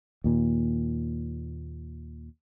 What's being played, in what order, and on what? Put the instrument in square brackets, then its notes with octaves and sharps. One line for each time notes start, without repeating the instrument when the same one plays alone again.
[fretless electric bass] D#2 A#2